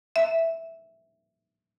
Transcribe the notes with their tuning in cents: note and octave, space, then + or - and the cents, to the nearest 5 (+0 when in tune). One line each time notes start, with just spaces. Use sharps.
E5 -5